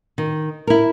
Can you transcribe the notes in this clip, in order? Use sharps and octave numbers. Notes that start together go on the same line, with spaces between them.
D#3
E4 A#4